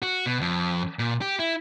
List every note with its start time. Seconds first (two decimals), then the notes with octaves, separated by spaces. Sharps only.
0.02 F#4
0.26 B2
0.41 F2
0.99 A#2
1.21 G4
1.39 E4